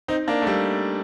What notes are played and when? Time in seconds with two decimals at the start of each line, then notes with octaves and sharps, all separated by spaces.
0.08 C4 D#4
0.28 A#3 D4
0.42 A3
0.47 G3 A#3